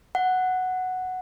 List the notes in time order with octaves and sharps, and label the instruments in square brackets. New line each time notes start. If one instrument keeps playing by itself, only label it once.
[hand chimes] F#5